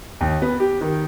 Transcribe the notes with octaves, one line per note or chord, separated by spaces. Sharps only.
D#2
B3
G4
D#3